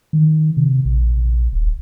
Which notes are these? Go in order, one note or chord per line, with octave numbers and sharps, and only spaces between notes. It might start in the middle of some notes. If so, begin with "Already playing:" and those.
D#3
C3
A#1
D#1